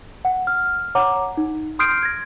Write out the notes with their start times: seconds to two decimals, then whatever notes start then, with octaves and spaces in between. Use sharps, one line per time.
0.25 F#5
0.47 F6
0.95 C#5 F#5 A#5 D6
1.37 D#4
1.79 C6 D#6 F6 G6 C7 D7
2.03 G#6 A#6